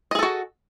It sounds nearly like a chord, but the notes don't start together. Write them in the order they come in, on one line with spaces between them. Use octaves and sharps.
D#5 G#4 A4 F#4